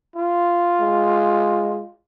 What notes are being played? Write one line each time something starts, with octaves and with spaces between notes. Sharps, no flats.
F4
G#3